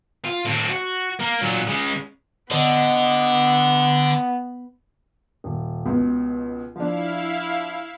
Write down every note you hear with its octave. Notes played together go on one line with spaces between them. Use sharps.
F4
A2 C4
F#4
A#3 A#4
A#2 F#3
C#3 G#3
D3 B3 D#5
D#1
C#2 B2
F3 D4 E4 F5